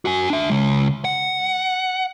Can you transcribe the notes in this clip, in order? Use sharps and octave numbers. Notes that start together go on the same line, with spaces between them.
F#4 G#5
D4 E5
C#3 G#3
F#5